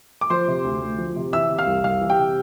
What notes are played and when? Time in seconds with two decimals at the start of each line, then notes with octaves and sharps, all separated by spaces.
0.21 D6
0.30 F3 C5 C6
0.48 C3
0.64 D2
0.82 D2
0.98 F3
1.16 C3
1.33 E3 E5 E6
1.50 C3
1.58 F5 F6
1.67 C2
1.84 C2 F5 F6
2.01 E3
2.10 G4 G5
2.19 C3